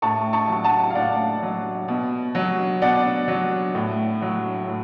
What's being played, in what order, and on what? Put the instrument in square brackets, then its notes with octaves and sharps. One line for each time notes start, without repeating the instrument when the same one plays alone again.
[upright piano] A2 A5 C#6
A5 C#6
F#3
F#5 A5
F5
A2 D5 F#5
F#3
B2
F#3
B2 D5 F#5
F#3
A2
F#3
A2